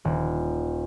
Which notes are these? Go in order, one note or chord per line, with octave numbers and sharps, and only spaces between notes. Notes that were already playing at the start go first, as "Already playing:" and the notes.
D#1